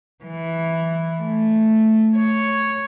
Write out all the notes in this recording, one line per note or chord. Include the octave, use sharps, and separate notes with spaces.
E3
A3
C#5